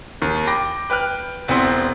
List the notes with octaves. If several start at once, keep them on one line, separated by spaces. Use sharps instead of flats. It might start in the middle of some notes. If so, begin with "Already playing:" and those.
D#2
G5 B5 D6 A#6
B4 G5 F6 F#6
E1 B3 C4 E4 C6